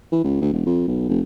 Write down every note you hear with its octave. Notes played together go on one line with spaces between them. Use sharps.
E3
C#2
D2
E1
F2
B1
F1